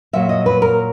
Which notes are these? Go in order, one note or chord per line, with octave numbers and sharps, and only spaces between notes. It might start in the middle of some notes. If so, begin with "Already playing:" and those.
A#2 F#3 E5
D#5
B4
A#4